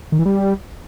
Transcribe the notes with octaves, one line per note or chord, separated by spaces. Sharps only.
D#3
E3
G3